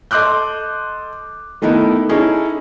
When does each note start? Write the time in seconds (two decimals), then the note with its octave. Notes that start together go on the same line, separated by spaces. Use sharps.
0.11 A4 D#5 C6 D6 F#6 G6
1.62 D#3 A3 B3 D#4 E4 A#4
2.09 C#4 D#4 E4 G#4 A4